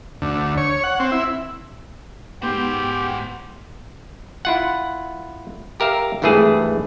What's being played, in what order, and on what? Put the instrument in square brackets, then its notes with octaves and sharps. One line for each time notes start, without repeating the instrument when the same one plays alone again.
[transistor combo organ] D2
C#5
F#5
C4
E4
[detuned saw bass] G#2 [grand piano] B3 [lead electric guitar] F#4 C5 [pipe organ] G4
[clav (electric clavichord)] E4 F4 F#5
G4 A#4 E5 F5
G#1 G2 E3 A3 G#4 A5